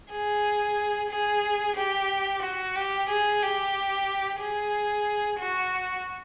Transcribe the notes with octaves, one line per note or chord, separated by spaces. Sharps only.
G#4
G#4
G4
F#4
G4
G#4
G4
G#4
F#4